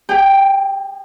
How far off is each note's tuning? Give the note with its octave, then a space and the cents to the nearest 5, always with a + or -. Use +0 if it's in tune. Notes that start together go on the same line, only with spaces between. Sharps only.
G#4 -45 G5 +0